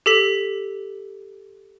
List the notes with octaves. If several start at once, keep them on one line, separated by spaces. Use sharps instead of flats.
G4 A4 B6 E7